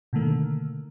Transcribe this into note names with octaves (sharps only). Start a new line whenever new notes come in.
B2 D3 D#3 A3 A#3